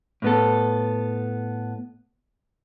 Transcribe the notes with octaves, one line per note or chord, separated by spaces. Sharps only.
A2 B3 A4